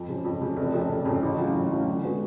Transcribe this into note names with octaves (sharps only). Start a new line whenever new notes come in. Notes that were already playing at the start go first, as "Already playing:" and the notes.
Already playing: F2
C#3 F3
F2
C#3 F3
F1
F2 C#3
F1
F2 C#3
A1
A2 F#3 C#4 F4
A1
A2 F#3 C#4 F4
D3
G#3 B3 F#4 A4